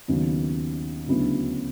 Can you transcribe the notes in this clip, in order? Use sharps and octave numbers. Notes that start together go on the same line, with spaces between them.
D#2 C#3 F#3 B3
D2 C#3 F#3 B3 E4